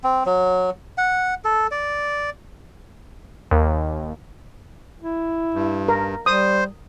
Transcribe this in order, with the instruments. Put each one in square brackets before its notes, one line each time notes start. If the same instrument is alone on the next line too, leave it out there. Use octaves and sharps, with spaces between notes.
[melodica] C4
F#3
F#5
A4
D5
[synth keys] D#2
[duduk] E4
[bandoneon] G2
[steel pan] A#4
[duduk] G3 [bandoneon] C5 [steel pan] D#6